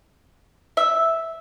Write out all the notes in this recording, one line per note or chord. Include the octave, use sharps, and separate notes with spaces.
E5